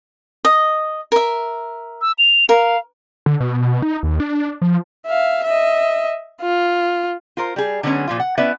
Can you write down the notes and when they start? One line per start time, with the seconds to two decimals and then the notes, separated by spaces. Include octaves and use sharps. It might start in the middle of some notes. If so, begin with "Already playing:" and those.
0.45 D#5
1.12 A#4 E5
2.02 E6
2.18 F7
2.49 A#4 F5
3.26 D3
3.40 B2
3.82 D#4
4.03 D#2
4.20 D4
4.62 F3
5.07 E5 F5
5.44 D#5 E5
6.41 F4
7.37 F4 A#4 C5
7.56 G3 G#4
7.83 D3 F#3 G#3 B3 C#4
8.08 A#2 F3 F4
8.20 F#5
8.38 B3 C#4 E4 B4 D5 E5